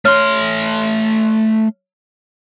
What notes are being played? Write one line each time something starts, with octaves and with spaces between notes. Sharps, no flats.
A3 C#5 C6 F6